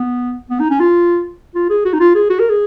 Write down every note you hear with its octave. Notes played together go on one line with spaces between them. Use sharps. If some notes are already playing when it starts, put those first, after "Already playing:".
Already playing: B3
B3
D#4
C#4
F4
F4
G#4
F#4
D#4
F4
G#4
F#4
A#4
G#4